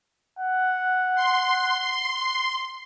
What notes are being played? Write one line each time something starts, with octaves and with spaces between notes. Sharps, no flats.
F#5
C6